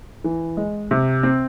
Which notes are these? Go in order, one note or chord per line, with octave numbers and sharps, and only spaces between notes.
E3
G#3
C3
C4